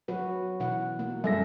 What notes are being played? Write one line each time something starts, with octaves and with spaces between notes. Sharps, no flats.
F#3 F#4 B4
B2 E3 F#5
A#3
F#2 A4 E5 A#6